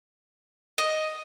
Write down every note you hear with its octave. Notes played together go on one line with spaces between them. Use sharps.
D#5